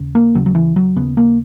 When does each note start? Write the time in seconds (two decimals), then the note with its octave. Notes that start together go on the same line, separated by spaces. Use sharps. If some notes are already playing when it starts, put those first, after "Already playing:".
Already playing: D#2 C#3
0.15 A#3
0.35 D#2 C#3 F#3
0.46 F#3
0.55 E3
0.76 F#3
0.96 D#2 C#3 B3
1.17 A#3